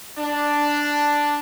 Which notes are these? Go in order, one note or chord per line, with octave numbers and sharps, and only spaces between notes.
D4